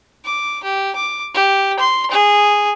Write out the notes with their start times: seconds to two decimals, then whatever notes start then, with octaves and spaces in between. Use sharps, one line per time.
0.25 D6
0.63 G4
0.96 D6
1.34 G4
1.79 C6
2.11 G#4